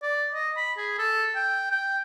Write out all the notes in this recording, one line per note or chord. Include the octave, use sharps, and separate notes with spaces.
D5
D#5
B5
G#4
A4
G5
G5